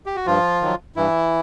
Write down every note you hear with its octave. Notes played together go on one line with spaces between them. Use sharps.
G4
F#4
G2 F3 F4
D#3 F#3
G2 E3 E4